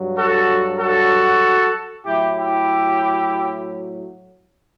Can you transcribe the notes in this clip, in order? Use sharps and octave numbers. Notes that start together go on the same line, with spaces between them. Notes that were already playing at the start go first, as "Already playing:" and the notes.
Already playing: G2 F#3
F#4 A4
F#4 A4
A2 F#3 E4 G4
E4 G4